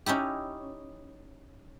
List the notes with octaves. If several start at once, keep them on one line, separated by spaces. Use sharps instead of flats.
C#4 D#4 E4 G4